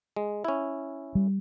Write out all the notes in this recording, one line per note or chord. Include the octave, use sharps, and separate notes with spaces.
G#3
C#4 E4
G3